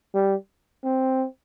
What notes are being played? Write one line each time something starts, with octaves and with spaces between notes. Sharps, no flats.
G3
C4